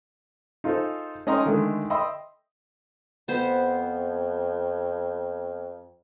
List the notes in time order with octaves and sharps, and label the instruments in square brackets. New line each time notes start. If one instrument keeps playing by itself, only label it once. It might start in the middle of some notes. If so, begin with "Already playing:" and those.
[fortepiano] D#4 F4 G#4 A4 C5
C#4 D#4 D#5 G5 A#5 C6
D3 D#3 G#3 A3
D#5 E5 G5 B5 C6 E6
[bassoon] F2 [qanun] B3 C5